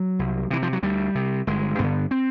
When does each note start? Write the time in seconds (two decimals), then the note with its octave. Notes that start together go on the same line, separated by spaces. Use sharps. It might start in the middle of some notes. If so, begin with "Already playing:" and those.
Already playing: F#3
0.19 C2
0.50 C3 E3
0.62 F3
0.73 F#3
0.83 D2 G3
1.15 C3
1.47 G1 G#3
1.79 G2 D3 B3
2.11 C4